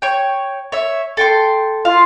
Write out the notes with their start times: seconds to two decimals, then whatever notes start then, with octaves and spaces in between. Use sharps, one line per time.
0.02 C#5 G5
0.72 C#5 E5
1.17 A4 G5 C6
1.85 F4 F5